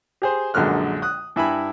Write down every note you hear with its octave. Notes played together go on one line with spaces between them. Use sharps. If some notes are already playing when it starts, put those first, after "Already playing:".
G4 G#4 C5
A#1 F#2 D3 G#3 F6 F#6
D#6 F#6
G2 E4 G#5 B5